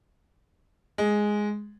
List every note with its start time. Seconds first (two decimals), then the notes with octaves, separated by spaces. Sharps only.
0.98 G#3